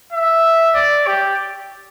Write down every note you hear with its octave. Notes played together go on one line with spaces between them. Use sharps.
E5
D5
G4